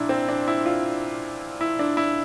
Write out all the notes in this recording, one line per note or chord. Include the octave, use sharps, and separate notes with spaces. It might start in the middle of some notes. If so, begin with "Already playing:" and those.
Already playing: A#2 F3 D4 E4
C4
D4
E4
F4
E4
D4
E4